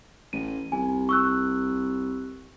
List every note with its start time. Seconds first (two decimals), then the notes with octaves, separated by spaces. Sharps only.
0.33 A1 D#7
0.72 C2 G#5
1.09 C#6 E6 F#6